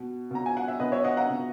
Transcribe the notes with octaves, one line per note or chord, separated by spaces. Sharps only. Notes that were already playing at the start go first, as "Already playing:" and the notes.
Already playing: B2
B2 A#5
G#5
F#5
E5
B2 B4 D#5
C#5 E5
D#5 F#5
F#5 A#5
B2